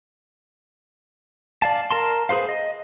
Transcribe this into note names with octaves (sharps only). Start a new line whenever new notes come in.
D5 F5 A5
A#4 A5 C6
G#4 B4 C5 F5
D#5